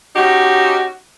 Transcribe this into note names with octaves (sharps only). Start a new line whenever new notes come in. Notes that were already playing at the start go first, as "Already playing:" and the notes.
C#4 D#4 F#4 G4